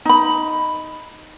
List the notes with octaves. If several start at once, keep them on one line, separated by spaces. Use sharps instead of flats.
D#4 B5